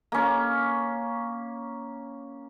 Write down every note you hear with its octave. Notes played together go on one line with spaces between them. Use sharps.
A#3 C#4